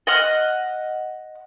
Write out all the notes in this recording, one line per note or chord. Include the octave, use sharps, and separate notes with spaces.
D#5 F#5 F6